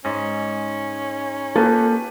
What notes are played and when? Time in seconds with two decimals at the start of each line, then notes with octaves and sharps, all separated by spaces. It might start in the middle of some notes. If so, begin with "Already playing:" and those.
0.05 G#2 C#4
1.56 A#3 F4 G4 A4 B4